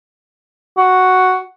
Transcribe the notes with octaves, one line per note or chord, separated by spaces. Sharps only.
F#4